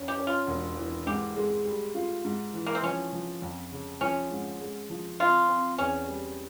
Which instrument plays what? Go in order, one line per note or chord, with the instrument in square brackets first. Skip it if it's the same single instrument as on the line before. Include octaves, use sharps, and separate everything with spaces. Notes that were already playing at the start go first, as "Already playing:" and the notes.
Already playing: [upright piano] F2 C#4
[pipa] G4
[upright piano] C#4
[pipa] F4
[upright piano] E1
E3
[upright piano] G#2 [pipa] G4
[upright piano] G#3
G3
F4
G#2
E3
[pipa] A#3
C4
[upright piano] F3 [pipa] C#4
[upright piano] F3
F2
C#3
[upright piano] F3 [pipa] C#4
[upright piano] G#2
G#3
F3
[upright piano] C4 [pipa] F4
[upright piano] C4
[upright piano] E2 [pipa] C#4
[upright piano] G3